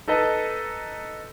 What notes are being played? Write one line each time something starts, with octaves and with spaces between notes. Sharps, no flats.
D#4 A4 B4 D#5 A5